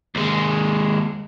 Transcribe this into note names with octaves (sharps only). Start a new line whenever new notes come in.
D#2 G#3